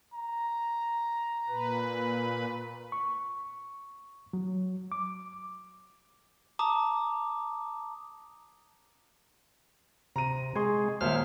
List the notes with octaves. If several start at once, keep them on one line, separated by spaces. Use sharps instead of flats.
A#5
A#2 B4
C#6
F#3
D6
A5 A#5 D6 D#6
C3 A#5 D#7
G#3 G#4 C6 C#6
D#1 A#3 C5 E5 F6